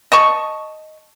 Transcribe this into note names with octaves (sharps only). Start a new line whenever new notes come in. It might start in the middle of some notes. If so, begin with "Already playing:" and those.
D#5 A5 C#6